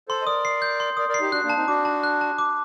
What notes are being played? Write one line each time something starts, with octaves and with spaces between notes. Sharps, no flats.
A4 C5 C6
D#5
A#4 D5 D#6
C7
G6
C6
A#4 D5 D#6
A#4 D5
C7
D#4 G4
D4 F#4 F#6
A#3 D4
A5
C4 D#4
D4 F#4 D6
A5
F#6
A5
D6